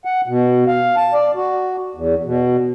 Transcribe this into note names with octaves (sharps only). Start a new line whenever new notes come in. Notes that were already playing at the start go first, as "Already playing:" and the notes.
F#5
B2
F5
A5
D5
F#4
E2
B2